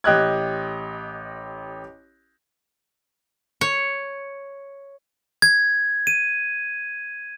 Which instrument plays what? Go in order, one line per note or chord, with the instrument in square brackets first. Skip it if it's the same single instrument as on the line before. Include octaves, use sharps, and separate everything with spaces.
[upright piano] A1 G4 D#5 F#6 G#6
[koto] C#5
[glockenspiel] G#6
D#7